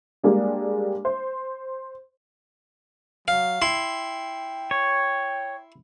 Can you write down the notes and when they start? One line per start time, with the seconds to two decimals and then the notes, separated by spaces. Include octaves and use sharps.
0.23 G3 G#3 A#3 D4 G4
1.05 C5
3.28 F#3 F5
3.62 E4 G5 C6
4.71 C#5